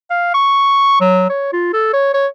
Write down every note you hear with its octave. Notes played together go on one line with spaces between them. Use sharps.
F5
C#6
F#3
C#5
F4
A4
C#5
C#5